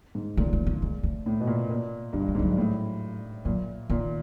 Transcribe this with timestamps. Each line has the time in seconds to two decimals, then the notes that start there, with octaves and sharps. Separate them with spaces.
0.15 G#2
0.37 A#2 A3
0.53 A3
0.67 A3
0.82 G#3
1.03 A3
1.26 A2
1.40 B2
1.47 A#2
1.69 A#2
2.13 G2 G#3
2.28 G3
2.35 G#2
2.39 F3
2.42 F#3
2.58 A2
3.45 A#2 F#3
3.90 A#2 D#3